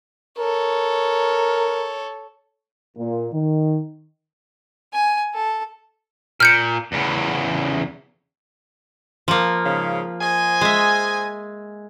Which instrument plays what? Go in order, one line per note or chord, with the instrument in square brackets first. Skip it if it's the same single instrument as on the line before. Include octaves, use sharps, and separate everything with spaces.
[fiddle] A4 C#5 [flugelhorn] A#4
[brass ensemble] A#2
D#3
[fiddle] G#5
A4
[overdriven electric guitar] A#2 [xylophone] F6 G6 C#7
[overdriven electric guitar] E2 C#3
[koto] F3 A#3
[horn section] G#2 C#3
C5 D#5 G#5
[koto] G#3 E5